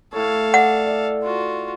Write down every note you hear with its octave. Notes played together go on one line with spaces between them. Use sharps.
A2 A4 C#5 F5
D5 F#5
D5 E5
F4 F#4